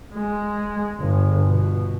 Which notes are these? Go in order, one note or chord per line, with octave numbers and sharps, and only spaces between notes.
G#3
G1
B2